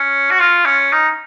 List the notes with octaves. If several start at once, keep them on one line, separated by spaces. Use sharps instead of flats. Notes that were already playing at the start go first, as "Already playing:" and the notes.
Already playing: C#4
F#4
F4
C#4
D#4